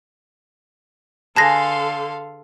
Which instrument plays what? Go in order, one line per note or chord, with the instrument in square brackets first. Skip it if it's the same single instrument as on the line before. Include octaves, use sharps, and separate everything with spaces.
[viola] D3 C6 [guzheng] G#4 B4 [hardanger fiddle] A4 F5 [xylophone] A5 A#6